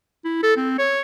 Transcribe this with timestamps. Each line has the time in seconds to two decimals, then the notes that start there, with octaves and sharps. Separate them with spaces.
0.25 E4
0.43 A4
0.56 C4
0.78 C#5